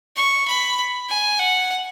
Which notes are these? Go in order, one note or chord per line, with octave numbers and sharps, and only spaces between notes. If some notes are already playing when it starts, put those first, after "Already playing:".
C#6
B5
G#5
F#5